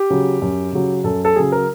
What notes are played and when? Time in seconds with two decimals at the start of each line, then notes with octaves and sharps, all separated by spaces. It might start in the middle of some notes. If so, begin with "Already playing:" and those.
Already playing: G4
0.10 C#3 F#3
0.42 F#2
0.73 C#3 F#3
1.04 F#2 A4
1.25 A4
1.36 C#3 F#3 G#4
1.52 A#4